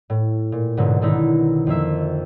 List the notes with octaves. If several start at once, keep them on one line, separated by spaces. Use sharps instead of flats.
A2
A#2
B1 G#2 B2 D3
B2 D3 D#3 D#4 E4
F2 A#3 E5